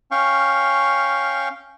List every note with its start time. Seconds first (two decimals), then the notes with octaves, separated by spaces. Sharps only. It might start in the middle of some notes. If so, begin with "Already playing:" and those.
0.11 C#4 F5 G5 C#6